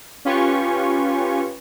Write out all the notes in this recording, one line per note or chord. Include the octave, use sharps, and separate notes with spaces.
C#4 F4 G4 B4 C#6